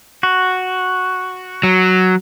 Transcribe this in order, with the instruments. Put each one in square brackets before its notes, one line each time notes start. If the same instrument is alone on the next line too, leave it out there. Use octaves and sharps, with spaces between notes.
[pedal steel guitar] F#4
[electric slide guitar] F#3